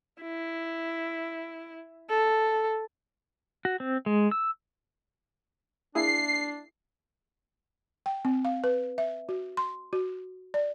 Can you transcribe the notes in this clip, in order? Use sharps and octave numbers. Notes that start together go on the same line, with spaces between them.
E4
A4
F#4
C4
G#3
E6
A#3 D4 E4 G#4 C7
G5
C4
F5
B4
E5
F#4
C6
F#4
D5